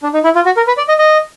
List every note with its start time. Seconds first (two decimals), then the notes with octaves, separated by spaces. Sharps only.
0.03 D4
0.14 D#4
0.24 E4
0.35 F4
0.45 F#4
0.57 A#4
0.67 B4
0.77 D5
0.88 D#5
0.98 D#5